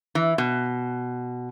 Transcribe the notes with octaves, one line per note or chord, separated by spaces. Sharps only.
E3
B2